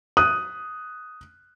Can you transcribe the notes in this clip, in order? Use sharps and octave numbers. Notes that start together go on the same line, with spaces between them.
D#6 F#6 D#7